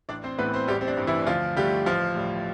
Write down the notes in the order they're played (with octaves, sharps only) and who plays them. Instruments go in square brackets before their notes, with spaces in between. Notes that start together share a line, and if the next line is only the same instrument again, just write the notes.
[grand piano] A1 D4 D5
C4 C5
A2 E3 A3 B3 B4
C4 C5
A1 G3 G4
C4
D4
G2 E3 A3
E3 E4
D2 F3 F4
D3 G3 A3 G4
A1 F3 F4
A2 G3